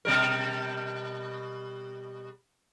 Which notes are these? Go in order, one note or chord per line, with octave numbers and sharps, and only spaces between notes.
B2 G3 A#4